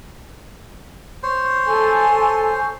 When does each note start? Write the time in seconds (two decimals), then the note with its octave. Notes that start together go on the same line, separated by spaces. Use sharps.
1.23 C5 C#5 C6
1.66 A4 G#5